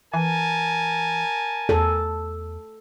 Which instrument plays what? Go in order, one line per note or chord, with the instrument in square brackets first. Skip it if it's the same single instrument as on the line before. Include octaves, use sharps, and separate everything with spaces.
[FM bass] E3 [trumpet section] A#4 G#5 A5
[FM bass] E2 [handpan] A4